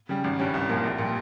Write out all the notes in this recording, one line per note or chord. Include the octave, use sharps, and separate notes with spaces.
C#3 G3
G#1
G2 G3 C#4
C2
A#2 F3 A#3
A#1
A#2 G3